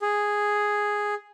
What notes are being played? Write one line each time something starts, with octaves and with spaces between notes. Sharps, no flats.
G#4